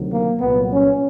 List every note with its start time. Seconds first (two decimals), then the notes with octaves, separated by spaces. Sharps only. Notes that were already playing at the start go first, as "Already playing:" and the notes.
Already playing: D2 C3 D#3 F#3
0.12 A#3
0.40 C2 A#2 F#3 B3
0.70 C#4